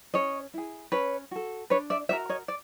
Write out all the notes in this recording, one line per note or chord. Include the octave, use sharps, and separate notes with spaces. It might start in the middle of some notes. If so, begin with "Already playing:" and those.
C#4 C#5 D#5
E4 G#4
C#4 B4 C#5
F#4 A4
D4 B4 C#5
D5 E5
F#4 A#4 D5 E5
C#5 D#5
D5